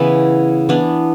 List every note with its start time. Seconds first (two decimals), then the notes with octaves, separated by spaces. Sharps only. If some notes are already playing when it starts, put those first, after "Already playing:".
Already playing: C#3 E3 B3 E4
0.69 E3 B3 D4